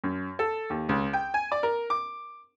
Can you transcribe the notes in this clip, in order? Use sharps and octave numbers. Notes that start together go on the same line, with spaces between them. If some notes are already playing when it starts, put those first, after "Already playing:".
F#2
A4
D#2
C#2
G5
G#5
D5
A#4
D6